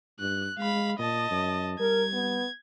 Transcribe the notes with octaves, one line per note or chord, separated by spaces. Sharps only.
G2 F#6
G#3 F5 B5
A#2 D#5 A5
F#2
G3 A#4 G#6
B3